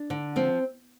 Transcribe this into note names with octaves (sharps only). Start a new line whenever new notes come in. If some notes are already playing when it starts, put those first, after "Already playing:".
Already playing: D4
D3
F3 C4